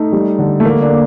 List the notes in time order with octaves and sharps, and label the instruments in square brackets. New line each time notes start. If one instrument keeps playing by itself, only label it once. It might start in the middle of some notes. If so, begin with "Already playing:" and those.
Already playing: [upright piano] A3 [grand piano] D#4
[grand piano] G3
D3
[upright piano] A3
[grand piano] D3 [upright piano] A#3
[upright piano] D4
[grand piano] A#3